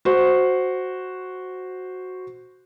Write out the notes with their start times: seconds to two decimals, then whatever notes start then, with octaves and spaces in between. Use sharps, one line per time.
0.05 F#4 C5